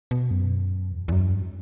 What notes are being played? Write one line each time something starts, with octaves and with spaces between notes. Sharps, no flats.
B2
F#2
E2
E2
F#2
G2